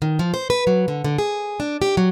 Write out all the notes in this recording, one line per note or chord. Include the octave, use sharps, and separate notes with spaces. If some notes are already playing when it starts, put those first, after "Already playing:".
D#3
F3
C5
B4
F#3
D3
D3
G#4
D4
G4
F#3